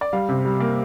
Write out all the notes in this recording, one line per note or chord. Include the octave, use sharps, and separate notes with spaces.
D5
G3 F5
C3
G3
A#3